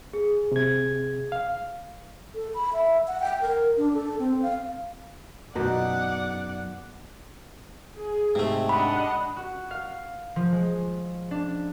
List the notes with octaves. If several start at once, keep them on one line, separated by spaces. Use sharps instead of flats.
G#4
C3 G#6
F5
A4
B5
E5
F#5
G5
A#4
D4
A4
C4
F5
F#2 B2 E3 D#4 D5 F#5
G#4
G#2 C3 G#3 A3
D4 D#5 F#5 B5
F#4
F5
F3
G#3
D4